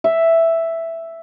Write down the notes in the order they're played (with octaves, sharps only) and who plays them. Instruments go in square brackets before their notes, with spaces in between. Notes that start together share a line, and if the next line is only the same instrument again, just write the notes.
[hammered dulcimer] E5